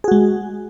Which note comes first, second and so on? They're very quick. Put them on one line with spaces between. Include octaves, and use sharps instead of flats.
G#4 F#4 G#3